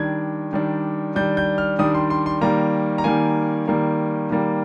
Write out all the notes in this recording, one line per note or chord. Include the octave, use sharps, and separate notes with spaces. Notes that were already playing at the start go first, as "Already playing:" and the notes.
Already playing: D#3 G3 D4 G#6
D#3 G3 D4
D#3 G3 D4 G6
G6
F6
D#3 G3 D4 D#6
C6
C6
C6
D#3 G3 A#3 A#5
A#5
D#3 G3 A#3 G#5
D#3 G3 A#3
D#3 G3 A#3